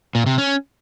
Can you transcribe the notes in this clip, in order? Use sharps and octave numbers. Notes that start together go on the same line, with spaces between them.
A#2
C3
C#4